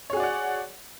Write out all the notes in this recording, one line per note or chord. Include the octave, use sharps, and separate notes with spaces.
F#4 G#4 C#5 D5 F#5